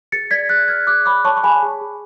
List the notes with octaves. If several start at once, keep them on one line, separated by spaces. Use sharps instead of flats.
G#4 A6 C#7
D5 G#6 B6
G#4 F#6 A6
D5 F6 G#6
G#4 D6 F#6
C#5 B5 D6
C#5 A5 C#6
C#6
G#4 G#5 B5
G#4
G#4